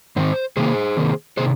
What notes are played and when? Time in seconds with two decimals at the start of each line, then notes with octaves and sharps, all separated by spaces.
0.16 G#2 D#3 C4 C5
0.57 C3 D#3 A#3 G#4 C5
0.97 C3 D#3 A#3
1.37 C3 D#3 G#4 C5